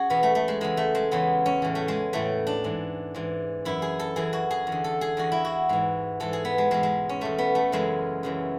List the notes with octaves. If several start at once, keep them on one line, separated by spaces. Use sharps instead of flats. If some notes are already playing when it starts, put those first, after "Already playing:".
Already playing: C#4 F#4 G#4
E2 B2 B3
A3
A3
G#3
E2 C#3 E3 G#3
A3
G#3
E2 C#3 E3 B3
C#4
A2 E3
A3
G#3
A2 E3 A3
D4
G#2 E3
G#2 E3
F#2 E3 E4
G#4
A4
F#2 E3 G#4
F#4
G#4
E2
D3
A4
G#4
E2 D3 F#4
E4
F#4
G#2 E3
G#2 E3 A4
G#4
B3
G#3
E2 B2 G#3
G#3
C#4
E2 B2 A3
B3
A3
F#2 C#3 E3 G#3
F#2 C#3 E3